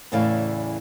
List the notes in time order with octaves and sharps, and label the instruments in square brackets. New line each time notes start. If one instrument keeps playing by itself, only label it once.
[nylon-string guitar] E2 A2 C#3 E3 D5 F5